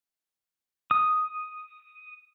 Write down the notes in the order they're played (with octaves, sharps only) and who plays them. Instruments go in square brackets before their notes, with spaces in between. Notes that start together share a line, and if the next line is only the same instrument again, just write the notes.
[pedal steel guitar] D#6